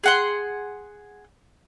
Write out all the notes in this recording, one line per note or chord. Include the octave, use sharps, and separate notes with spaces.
G#4 F#5 C6